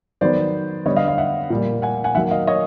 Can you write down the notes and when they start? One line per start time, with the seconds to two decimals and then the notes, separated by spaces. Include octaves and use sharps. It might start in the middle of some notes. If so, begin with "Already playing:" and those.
0.21 D#3 F#3 B3 C5 D5
0.86 D3 G3 B3 C#5 D#5
0.96 D#5 F5
1.08 D#5 F5
1.18 E5 F#5
1.50 A#2 G3 A#3
1.82 F#5 G#5
2.04 F#5 G#5
2.15 D#3 F#3 A#3 E5 F#5
2.31 D#5 F5
2.47 C#5 D#5